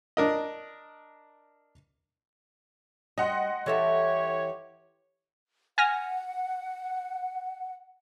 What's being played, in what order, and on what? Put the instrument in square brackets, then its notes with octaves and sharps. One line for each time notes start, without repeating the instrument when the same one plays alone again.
[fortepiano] D4 A#4 D#5
[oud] G3 [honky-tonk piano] D#5 F#5 C6
[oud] E3 A4 E5 [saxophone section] G4 C#5
[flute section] F#5 [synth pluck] G#5 F6 A#6